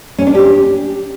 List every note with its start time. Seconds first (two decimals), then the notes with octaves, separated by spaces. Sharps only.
0.18 C#4
0.27 D4
0.35 G4